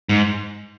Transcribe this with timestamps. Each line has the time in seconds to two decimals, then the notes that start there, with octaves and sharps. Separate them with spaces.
0.09 G#2